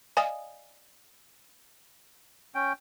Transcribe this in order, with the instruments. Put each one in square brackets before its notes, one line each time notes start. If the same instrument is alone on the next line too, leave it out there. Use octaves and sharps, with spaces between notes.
[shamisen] D5 D#5 F5 [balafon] G#5
[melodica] C#4 G5